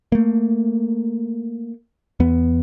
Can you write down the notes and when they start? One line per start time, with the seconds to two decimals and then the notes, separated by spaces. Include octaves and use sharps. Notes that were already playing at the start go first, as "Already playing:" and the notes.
0.12 A3 A#3
2.20 E2 B3